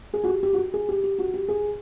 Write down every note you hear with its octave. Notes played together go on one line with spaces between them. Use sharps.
G#4
F#4
G4
G4
F#4
G4
G#4
G4
G4
F#4
G4
G#4